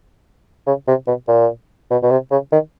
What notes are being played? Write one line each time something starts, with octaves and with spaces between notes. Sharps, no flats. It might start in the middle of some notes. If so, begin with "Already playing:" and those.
C#3
C3
B2
A#2
B2
B2
C3
C#3
D#3